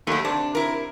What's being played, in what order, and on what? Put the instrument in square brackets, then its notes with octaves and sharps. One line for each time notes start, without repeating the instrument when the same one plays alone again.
[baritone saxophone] D#2 [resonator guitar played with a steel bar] F#3 A3
[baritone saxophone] C3 [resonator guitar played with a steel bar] D4
[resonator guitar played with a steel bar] E4 A#4